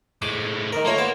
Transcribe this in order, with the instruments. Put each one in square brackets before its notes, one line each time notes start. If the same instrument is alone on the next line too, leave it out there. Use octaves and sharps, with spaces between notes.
[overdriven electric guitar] A2 G#3 [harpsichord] D6
[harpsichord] D#3 A#4
[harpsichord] A3 F4 C#5 [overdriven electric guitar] A#3
[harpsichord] B3 A5